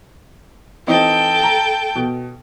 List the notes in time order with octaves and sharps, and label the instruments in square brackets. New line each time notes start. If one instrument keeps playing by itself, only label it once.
[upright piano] E3 C4 D#4 [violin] A4 G5
[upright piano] A#5
B2